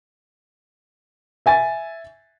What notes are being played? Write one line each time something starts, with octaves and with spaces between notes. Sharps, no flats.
E5 G#5 A6